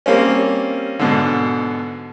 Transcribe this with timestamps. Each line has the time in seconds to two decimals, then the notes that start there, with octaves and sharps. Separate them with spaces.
0.06 G3 A#3 C4 C#4
0.99 G#2 B2 D3